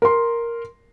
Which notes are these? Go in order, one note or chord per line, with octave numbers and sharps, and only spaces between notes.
A#4 C6